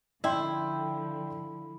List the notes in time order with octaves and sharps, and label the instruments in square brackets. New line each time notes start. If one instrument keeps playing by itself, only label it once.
[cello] D3 F3 [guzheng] E4 [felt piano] D5 G5 C6